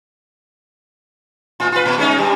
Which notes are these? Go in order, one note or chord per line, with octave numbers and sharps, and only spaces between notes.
A2 F4
F4 B4
A#2
G#3 C#4 D#4
G2 G3